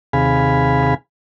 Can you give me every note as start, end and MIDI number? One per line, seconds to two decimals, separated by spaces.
0.13 0.94 39
0.13 0.94 48
0.13 0.94 68
0.13 0.94 77
0.13 0.94 80
0.13 0.94 83